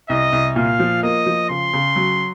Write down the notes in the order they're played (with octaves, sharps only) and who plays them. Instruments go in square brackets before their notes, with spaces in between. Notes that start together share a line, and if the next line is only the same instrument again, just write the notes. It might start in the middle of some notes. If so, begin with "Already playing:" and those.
[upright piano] C2 [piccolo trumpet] D#5
[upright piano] C2
[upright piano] A#2 [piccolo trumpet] F5
[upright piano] F3
[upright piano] A#3 [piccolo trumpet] D#5
[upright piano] F3
[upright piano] C#3 [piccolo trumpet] C6
[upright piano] C#3
F#3